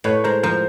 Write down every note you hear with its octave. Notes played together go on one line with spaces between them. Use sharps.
A2 B4 C#5
G#3 A#4 C5
F3 A#4 C5